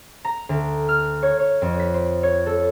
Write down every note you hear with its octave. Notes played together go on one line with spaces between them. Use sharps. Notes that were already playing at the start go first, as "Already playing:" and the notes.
A#5
D2
F6
C#5
C#5
F2
B6
C5
C#5
A4